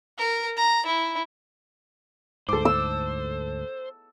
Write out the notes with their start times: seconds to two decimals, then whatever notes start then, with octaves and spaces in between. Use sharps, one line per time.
0.18 A#4
0.57 A#5
0.86 E4
2.49 D2 G#2 A4 C5 D6
2.65 E6